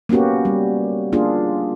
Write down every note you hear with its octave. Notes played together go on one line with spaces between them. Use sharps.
A#3 B3 C#4 F#4 G4
G3
A#3 D4 F4 G#4